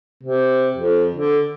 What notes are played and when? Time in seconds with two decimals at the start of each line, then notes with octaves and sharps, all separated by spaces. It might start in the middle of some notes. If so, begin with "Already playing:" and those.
0.23 C3
0.77 F2
1.15 D3